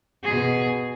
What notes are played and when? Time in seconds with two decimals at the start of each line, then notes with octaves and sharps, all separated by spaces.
0.23 B2 G#4